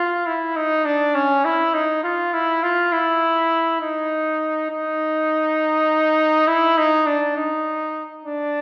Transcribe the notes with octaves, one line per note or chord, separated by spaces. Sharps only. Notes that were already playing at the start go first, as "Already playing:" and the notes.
Already playing: F4
E4
D#4
D4
C#4
E4
D#4
F4
E4
F4
E4
D#4
D#4
E4
D#4
D4
D#4
D4